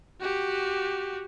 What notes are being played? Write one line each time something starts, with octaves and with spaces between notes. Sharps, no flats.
F#4 G4